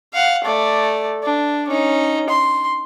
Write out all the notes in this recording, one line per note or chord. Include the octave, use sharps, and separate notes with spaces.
F5 F#5
A3 D5
D4
C#4 D#4
C6